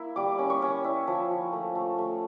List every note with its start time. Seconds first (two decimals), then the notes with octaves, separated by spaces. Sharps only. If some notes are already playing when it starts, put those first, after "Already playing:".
Already playing: A#3 E4
0.16 G3 D6
0.39 C#4
0.50 C#6
0.62 C#4
0.84 E4
1.07 F3
1.30 F3
1.53 A3
1.75 A3
1.98 A3